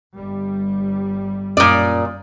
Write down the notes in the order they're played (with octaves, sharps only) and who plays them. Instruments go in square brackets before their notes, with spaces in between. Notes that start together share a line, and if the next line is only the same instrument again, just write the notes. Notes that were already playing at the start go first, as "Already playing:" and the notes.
[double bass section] G1 G3
[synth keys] F#2 C#4 D#6 [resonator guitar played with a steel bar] A#2 D5